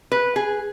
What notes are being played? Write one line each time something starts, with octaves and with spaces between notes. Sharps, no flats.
B4
G#4